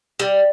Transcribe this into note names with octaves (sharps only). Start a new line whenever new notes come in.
G3